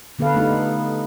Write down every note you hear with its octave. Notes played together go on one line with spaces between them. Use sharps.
D3 B3 A4 B4 F5
A3 B3 D#4 F4 G4
B3